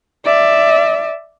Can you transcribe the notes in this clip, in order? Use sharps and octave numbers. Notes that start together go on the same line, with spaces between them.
D5 E5